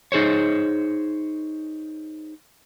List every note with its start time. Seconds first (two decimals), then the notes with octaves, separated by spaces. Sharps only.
0.12 D#4 G#4 C5 C#5